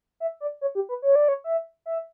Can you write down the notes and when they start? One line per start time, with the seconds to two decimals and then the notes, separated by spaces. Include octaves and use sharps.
0.20 E5
0.40 D5
0.61 C#5
0.75 G4
0.89 B4
1.02 C#5
1.15 D5
1.28 C#5
1.44 E5
1.86 E5